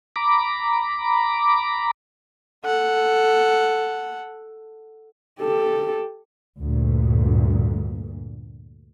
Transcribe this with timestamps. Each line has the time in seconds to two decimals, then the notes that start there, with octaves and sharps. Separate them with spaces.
0.16 A#5 B5 D6
2.65 A4 F#5
5.40 G4 A4
6.59 D2 G2 A#2